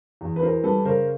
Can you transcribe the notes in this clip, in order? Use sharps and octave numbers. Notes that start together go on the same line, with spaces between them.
E2
B4
E3 A#4 C5
G3 A4 B4
C#3 A#4 C5